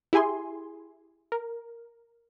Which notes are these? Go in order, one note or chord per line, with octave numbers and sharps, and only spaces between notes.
E4 G4 G#4 G#5 C6
A#4